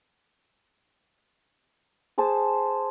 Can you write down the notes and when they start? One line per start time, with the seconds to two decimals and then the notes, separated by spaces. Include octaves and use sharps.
2.18 G#4 C5 A5